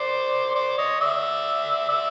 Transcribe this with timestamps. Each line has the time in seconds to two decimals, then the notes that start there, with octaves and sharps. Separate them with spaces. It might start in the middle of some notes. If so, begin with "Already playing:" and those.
Already playing: C5 D5
0.55 C5 D5
0.78 C#5 D#5
1.00 D5 E5
1.89 D5 E5